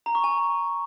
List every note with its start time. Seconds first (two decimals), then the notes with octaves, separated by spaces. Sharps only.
0.06 A#5
0.15 C#6
0.24 G#5